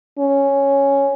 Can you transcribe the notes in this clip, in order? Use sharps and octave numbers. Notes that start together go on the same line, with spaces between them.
C#4